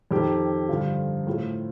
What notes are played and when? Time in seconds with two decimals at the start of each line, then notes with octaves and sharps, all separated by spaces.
0.11 F2 D#3 G4
0.69 G2 D3 F3 F4
1.27 A2 F3